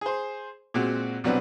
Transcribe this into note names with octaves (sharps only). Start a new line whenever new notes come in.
G#4 C5
A#2 G#3 C4 F#4
C2 B2 F#3 C4 D4 B4